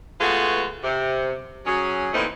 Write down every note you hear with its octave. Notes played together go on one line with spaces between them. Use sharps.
G#3 A3 B3 F4 F#4 B4
C3
F#3 C#4 G#4
A#2 E3 F3 A3 C4 D#4